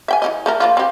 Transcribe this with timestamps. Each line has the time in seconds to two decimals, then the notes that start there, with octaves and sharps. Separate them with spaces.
0.08 E5 G5 G#5
0.22 E3 B3 D#5
0.46 A3 A4 A#4
0.60 F3 A#3 F4
0.77 C4 G4